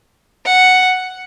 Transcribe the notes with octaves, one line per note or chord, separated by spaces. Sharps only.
F#5